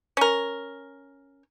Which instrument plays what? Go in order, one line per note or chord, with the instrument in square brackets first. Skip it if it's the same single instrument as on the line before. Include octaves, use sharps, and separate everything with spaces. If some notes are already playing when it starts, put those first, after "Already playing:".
[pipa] C#4 A#4